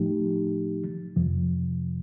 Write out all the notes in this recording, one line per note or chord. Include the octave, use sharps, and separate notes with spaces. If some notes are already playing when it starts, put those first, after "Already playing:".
Already playing: A2 F3 A3 D#4 G4
F2 C3 F3